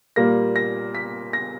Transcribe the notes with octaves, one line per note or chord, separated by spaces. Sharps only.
A#2 G3 A#3 A#6
A#6
B6
A#6